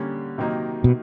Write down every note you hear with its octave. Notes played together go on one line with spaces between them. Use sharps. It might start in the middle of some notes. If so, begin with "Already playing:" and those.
Already playing: D3 G3 A#3 C#4
C3 D#3 F#3 A#3 D#4
B2